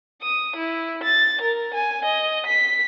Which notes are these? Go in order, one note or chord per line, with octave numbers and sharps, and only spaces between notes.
D#6
E4
A6
A#4
G#5
D#5
B6